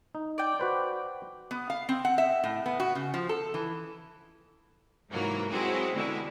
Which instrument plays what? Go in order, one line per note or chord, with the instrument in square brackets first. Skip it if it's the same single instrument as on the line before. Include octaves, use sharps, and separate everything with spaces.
[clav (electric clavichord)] D#4
[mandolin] D5 G5
[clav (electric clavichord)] F#4 B4 C5
[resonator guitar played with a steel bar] B3
F5
C4
F#5
E5
A2
B3
F#4
C#3
F3
A4
E3
[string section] G#2 C3 E3 F#3 A#3 A#4
F#3 G#3 C4 E4 F#4 G#4
B2 D3 G3 G#3 E4